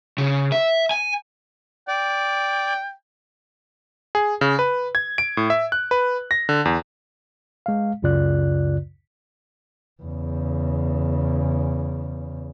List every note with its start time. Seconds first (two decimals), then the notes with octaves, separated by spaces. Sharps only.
0.18 C#3
0.52 E5
0.91 G#5
1.88 D5 G5
4.15 G#4
4.41 C#3
4.59 B4
4.95 G#6
5.18 D7
5.37 A2
5.50 E5
5.72 F#6
5.91 B4
6.31 A#6
6.49 D3
6.65 E2
7.66 G#3 F5
8.02 C#2 F#2 C#3 F4 D5 F#6
10.03 E2 C#3